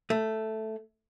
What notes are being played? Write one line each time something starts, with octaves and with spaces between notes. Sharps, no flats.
A3